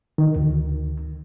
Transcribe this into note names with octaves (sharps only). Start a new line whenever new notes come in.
D#3
D2